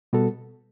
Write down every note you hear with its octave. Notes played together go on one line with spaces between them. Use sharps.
B2 G3 B3 F#4 A4